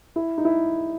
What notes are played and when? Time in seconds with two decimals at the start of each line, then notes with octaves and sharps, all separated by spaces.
0.16 E4
0.38 D#4
0.45 E4